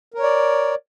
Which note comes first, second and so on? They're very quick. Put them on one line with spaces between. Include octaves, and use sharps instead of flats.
A#4 C#5 D5